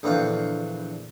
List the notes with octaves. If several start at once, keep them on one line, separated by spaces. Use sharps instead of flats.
A#1 E2 D3 F4 F5 G5